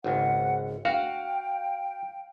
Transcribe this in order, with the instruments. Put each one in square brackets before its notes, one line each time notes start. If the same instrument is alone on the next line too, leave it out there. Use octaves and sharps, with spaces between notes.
[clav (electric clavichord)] G#1 C#2 [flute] F#5
[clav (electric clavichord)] F#4 [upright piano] F5 [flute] G5